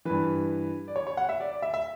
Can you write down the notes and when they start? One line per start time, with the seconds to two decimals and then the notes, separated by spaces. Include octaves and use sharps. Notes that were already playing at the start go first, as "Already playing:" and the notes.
0.05 G2 E3 B4
0.88 D5
0.96 C#5
1.07 C#5
1.17 F#5
1.29 E5
1.40 D5
1.52 D5
1.62 E5
1.74 E5